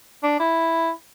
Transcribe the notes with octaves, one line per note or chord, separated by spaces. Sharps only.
D4
E4